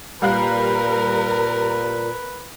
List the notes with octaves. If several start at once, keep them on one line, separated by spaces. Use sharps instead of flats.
A#2 G3 A#4 B4 F5 F#6